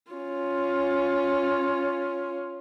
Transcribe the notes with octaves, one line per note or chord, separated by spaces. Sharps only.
C#4 F4